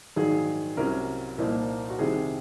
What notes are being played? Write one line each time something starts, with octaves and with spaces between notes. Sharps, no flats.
A#1 G#2 D#3 F#3 G#4
C2 C3 F#3 C#4 A#4
C2 A#2 F3 A#3 D#4
F#4
C2 C3 D#3 G#4